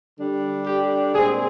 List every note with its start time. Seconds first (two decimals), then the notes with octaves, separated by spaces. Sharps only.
0.18 D3 G3 D4
0.66 G4
1.14 A#2 G#3 C4 G#4